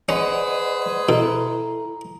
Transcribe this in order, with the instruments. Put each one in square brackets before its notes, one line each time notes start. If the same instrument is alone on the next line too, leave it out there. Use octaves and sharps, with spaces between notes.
[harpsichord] C#4 [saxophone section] G#4 B4 C5 [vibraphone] D5 D#5 F#5
[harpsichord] B2 [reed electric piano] E4 A4 [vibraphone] A#5